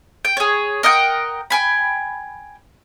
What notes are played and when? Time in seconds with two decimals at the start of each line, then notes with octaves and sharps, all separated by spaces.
0.25 G5
0.37 G#4 C#5
0.83 A#4 D#5 F#5 G5
1.50 G5 G#5 B5